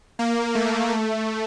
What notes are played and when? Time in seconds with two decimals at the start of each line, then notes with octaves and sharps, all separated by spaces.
0.19 A#3
0.55 A3
0.90 A3